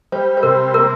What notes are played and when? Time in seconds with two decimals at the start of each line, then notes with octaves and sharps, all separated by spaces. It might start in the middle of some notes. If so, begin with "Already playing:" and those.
0.12 G3 C5
0.37 C5
0.43 C3 A#4
0.74 A#3 A#4